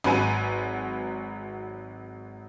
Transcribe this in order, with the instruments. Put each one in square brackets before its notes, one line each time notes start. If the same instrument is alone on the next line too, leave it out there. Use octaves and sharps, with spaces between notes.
[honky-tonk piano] G#1 F#3 B4 G#5 D#7